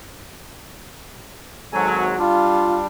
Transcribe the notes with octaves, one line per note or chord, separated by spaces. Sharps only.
G#1 G#2 F#3 A4 G#5
G3 D4 F4